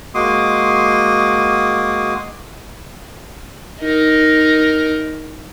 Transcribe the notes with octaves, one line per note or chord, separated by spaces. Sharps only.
G#3 A#3 F#4 C6 D6 D#6
D#4 A#4